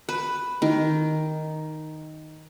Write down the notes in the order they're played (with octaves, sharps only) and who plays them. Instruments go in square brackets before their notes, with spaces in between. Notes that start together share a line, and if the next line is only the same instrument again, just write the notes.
[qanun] B4
[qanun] D#3 [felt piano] D#4